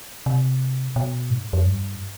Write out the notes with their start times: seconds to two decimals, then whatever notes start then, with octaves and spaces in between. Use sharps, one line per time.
0.26 C3
0.96 B2
1.30 G#2
1.53 F2
1.66 G2